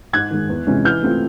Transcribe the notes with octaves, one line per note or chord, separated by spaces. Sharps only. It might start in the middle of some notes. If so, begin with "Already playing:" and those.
G#2 F#6 G#6
D#3 G#3
E2
C3 E3 G#3 C#4
E3 F6 G6
A3 C4 F4